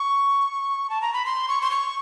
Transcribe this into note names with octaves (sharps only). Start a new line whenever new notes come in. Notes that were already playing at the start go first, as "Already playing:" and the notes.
Already playing: C#6
A5
A#5
B5
C6
C#6
C6
C#6